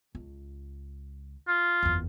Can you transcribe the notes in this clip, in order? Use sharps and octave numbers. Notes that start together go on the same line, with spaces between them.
C#2
F4
F#1 E2